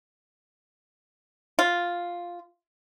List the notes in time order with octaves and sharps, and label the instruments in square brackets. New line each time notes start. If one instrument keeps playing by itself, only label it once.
[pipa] F4